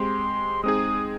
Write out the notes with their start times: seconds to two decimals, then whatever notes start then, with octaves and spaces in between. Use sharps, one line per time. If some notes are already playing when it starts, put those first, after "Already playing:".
Already playing: G#3 C4 G4 C6
0.63 G#3 C4 D#4 G#4 D#6